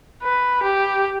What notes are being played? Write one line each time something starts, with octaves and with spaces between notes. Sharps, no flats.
B4
G4